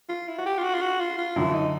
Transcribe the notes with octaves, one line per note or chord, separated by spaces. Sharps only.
F4
E4
F#4
G4
F4
F#4
F4
F#4
F4
F4
F#2 D3 F3 E4
D#4